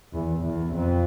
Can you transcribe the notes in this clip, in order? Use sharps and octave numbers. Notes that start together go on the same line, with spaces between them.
E2
E2
F2